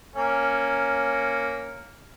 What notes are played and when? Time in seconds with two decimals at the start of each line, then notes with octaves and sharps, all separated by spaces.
0.16 A#3 C#4